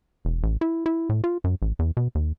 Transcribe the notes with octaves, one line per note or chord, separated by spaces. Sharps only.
E1
A1
E4
E4
A2
F4
F#2
A1
E2
B2
D#2